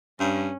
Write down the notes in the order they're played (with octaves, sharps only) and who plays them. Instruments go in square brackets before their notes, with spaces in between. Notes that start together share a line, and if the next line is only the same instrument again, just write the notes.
[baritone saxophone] G2 [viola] C#4